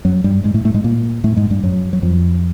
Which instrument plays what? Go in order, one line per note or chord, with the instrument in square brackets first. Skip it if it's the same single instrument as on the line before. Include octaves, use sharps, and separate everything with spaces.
[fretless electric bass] F#2 F#3
G2 G3
G#2 G#3
A2 A3
A2 A3
G#2 G#3
A#2 A#3
A2 A3
G#2 G#3
G2 G3
F#2 F#3
F#3
F2 F3